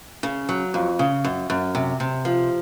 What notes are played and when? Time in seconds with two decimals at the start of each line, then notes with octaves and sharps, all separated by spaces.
0.23 C#3
0.49 F#3
0.74 F2
0.99 C#3
1.24 F#2
1.50 F#2
1.75 C3
2.00 C3
2.25 F3